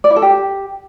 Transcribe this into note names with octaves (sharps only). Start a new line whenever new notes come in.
D5
E4
A4
G4